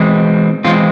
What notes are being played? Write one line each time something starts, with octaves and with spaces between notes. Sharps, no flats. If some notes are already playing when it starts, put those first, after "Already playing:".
Already playing: E3 G#3 C4
E3 G#3 C4 F4